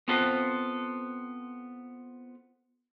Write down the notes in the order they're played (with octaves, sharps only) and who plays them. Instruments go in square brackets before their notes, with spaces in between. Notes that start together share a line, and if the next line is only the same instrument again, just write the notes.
[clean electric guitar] B3 C4 F4 A4 B4 C5